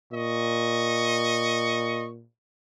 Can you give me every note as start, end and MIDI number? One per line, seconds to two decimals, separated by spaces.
0.13 2.25 46
0.13 2.06 75
0.13 2.06 85